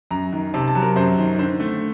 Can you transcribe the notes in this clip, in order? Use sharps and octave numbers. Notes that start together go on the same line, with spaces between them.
F#2 A#5
D#3
C3 A5
A5
F#3
A#4
F#2 C5
D#3
D3 C5
A3